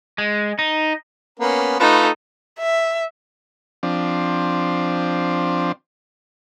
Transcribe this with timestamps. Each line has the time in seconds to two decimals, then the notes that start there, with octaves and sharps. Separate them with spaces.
0.18 G#3
0.59 D#4
1.40 A#3 B3 C#4
1.80 A3 D#4 F4 A4 B4
2.59 E5
3.83 F3 C4 D4